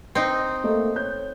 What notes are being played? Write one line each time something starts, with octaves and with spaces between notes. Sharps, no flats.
C4 D#4
A3 A#3 D#5
C#5 G6